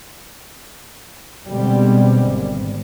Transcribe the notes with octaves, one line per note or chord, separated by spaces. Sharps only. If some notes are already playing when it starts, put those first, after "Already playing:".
B2 D3 G3 G#3 B3 C4
G#1